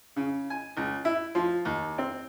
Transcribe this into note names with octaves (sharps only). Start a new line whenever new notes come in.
C#3
G#5
C#2
E4
F3
D#2
C4